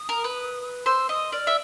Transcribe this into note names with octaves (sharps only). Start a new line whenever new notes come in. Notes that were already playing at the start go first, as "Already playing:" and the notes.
Already playing: D#6
A#4
B4
C5 E6
D#5 D#6
D5 F6
E5